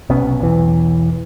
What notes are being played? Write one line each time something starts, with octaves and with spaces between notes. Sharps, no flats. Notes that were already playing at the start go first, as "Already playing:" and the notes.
B1 C3 B3 C#4
B1 E2 E3